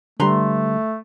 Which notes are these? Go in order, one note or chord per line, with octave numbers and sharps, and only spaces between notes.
D3 G3 A3 B4 A#5 C6